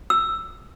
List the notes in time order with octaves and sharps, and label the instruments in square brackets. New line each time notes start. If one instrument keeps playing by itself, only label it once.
[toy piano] E6